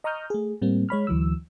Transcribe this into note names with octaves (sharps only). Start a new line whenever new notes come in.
D#5 A#5 C#6 D#6 F6 G6
A3 G#4
A2 G3 A#3 C4
G#3 C#5 B5 F6
D2 E3 F#3 E6